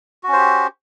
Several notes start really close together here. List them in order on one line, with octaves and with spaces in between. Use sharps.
F#4 C#4 C5 G4